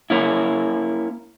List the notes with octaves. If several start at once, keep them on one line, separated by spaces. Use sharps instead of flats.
A#3 C#4 E4